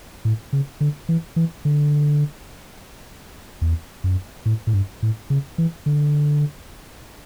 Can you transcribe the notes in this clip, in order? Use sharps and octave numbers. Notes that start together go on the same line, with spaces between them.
A2
C#3
D3
E3
E3
D3
E2
F#2
A2
A2
G2
A2
C#3
E3
D3